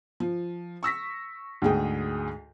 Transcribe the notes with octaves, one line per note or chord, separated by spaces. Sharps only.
F3
C#6 E6 A#6 B6
D2 G#2 G#4 G5